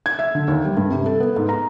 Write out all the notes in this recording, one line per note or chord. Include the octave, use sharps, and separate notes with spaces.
G#6
E5
D3
D#2
G3
G2
C3
A4
B3
G#2
A#5